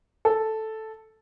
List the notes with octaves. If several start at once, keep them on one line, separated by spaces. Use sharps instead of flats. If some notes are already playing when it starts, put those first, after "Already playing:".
A4